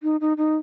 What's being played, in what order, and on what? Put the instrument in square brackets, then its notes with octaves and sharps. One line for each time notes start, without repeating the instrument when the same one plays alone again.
[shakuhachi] D#4
D#4
D#4